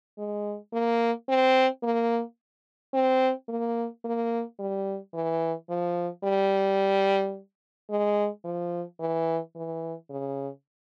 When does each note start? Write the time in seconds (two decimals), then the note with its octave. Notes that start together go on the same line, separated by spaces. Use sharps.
0.18 G#3
0.73 A#3
1.29 C4
1.83 A#3
2.93 C4
3.48 A#3
4.05 A#3
4.59 G3
5.14 E3
5.70 F3
6.24 G3
7.90 G#3
8.44 F3
9.00 E3
9.56 E3
10.10 C#3